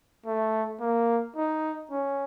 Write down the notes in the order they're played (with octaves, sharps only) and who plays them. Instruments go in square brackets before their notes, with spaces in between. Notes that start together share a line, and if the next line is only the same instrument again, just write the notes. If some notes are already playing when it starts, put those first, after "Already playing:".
[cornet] A3
A#3
D#4
C#4